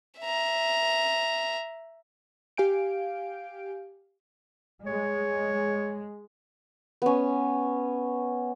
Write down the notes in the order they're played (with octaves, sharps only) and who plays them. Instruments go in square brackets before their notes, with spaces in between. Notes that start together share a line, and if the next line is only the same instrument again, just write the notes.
[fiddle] E5 A#5
[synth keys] G4 F5 G#5 G6 D7
[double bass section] G#3 [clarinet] C#5
[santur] B3 C#4